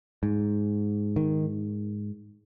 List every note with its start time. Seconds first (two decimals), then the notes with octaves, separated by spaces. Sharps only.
0.23 G#2
1.16 D#3